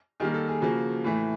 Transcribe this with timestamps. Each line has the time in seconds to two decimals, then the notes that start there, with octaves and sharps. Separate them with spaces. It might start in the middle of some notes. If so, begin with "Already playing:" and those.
0.20 D#3 G3 A#3 G#4
0.34 A4
0.49 G#4
0.62 C#3 F3 A#3 F#4
1.04 A2 E3 A3